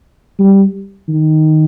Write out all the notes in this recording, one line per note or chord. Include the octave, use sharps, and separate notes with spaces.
G3
D#3